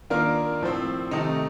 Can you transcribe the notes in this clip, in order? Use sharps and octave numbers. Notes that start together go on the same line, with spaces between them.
D#3 A#3 D4 F4 A#4
A2 F3 C4
C3 D#3 A3 D#4